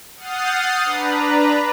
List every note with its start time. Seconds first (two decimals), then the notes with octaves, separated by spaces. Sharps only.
0.17 F#5 D#6 F6 G6 A6 C7
0.84 D4 B4 A#5